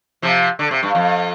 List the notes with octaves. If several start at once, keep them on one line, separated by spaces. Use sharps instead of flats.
C3 F3
D3
C3
G2
F2